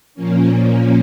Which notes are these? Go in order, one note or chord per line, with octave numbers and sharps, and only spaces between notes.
A#2 F3 A#3 C#4